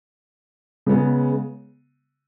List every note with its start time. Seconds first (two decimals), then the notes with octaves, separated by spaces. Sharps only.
0.86 C#3 G#3 B3